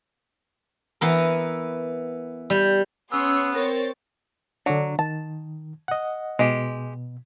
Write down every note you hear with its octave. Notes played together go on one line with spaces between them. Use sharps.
E3 B3 A#4
G3
B3 C#4 G#4 C#5 C6 E6
C4 A#4 C#5 A6
D3 F#3 D4
D#3 A5
D#5 F#5
B2 G#3 G4